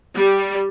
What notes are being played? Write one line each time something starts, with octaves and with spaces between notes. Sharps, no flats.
G3